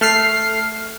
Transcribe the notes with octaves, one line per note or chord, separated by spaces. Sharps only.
A3 F6 C7